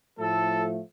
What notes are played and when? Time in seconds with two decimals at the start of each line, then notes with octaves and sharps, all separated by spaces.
0.19 A2 F3 A3 A4